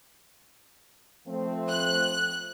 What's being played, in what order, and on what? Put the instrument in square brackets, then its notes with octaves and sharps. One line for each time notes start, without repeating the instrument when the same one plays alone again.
[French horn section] F3 A3 C4
[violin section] F#6